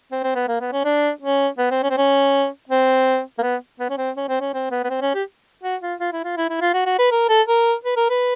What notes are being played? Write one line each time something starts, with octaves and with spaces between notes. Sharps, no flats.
C4
C4
B3
A#3
B3
C#4
D4
C#4
B3
C4
C#4
C4
C#4
C4
A#3
B3
B3
C#4
C4
C#4
C4
C#4
C4
B3
B3
C4
C#4
G4
F#4
F4
F4
E4
F4
E4
E4
F4
F#4
F#4
B4
A#4
A4
A#4
B4
A#4
B4